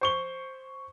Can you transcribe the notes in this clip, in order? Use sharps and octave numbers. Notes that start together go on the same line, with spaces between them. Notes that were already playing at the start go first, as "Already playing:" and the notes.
C5 C#6 G7